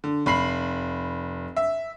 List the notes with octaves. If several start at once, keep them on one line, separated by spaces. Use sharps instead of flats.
D3
F1 B5 C7 F#7
E5